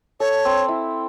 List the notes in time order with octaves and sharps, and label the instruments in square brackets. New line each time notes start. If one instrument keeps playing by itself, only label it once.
[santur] A4 [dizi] C#5
[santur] C4
E4